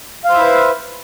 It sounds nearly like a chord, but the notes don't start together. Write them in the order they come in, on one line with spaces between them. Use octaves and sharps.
F5 C5 E5 E4 B4